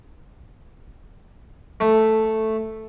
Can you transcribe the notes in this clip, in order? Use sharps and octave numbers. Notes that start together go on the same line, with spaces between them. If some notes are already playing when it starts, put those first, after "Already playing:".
A3